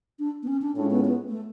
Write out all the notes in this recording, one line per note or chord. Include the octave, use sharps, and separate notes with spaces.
D4
B3
C#4
D4
A2 G#3 C#4 D4 F4
B3
B3
A3